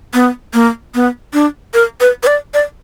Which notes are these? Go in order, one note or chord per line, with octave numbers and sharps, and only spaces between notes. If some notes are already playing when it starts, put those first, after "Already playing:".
B3
A#3
B3
D4
A#4
B4
B4
D5
D5